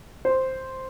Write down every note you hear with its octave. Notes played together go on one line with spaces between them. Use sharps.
C5